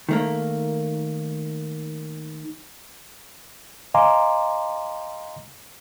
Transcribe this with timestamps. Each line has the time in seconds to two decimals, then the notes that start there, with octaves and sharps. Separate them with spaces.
0.09 D#3 A3 A#3
3.94 D#5 F5 G#5 A#5 C6 D6